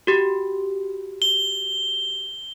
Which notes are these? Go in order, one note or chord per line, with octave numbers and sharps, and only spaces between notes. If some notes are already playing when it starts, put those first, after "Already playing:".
F#4 G4
G7